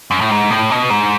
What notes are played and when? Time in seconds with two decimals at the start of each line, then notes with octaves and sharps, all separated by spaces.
0.11 F#2
0.21 A2
0.31 G#2
0.50 A2
0.70 B2
0.90 G#2